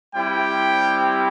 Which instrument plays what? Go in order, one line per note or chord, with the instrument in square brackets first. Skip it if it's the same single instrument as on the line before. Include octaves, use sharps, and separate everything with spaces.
[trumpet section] G3 C4 E4 G4 G5